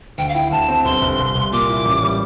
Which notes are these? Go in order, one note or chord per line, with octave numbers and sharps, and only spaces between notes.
D2 G5
F5
E4 G5
D2 A5
C4
G1 C6
G1
C2
C2
A#2 D6
E4
A1
G3